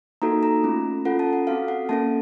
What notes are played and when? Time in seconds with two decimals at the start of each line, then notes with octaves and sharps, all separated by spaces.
0.22 A#3 D#4 F#4 A4 A#5
0.43 A#5
0.64 A3 C#4 F4
1.05 C#4 F4 A4 F#5
1.19 A5
1.33 F#5
1.47 C4 F#4 A4 F5
1.68 F#5
1.89 A#3 C#4 A4 A5